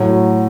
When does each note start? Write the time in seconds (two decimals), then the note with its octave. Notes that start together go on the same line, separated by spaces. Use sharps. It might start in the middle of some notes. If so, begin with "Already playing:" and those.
Already playing: A2 F#3